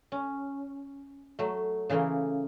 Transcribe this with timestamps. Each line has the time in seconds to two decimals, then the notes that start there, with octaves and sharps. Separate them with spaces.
0.12 C#4
1.39 F#3 A3
1.89 C#3 E3 A3 A#3